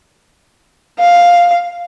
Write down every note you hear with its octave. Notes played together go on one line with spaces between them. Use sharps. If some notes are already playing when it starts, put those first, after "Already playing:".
F5